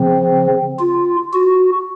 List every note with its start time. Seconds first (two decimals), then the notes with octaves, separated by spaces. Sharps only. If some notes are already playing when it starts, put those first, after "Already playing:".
Already playing: C#3 F3 C4
0.79 F4
1.33 F#4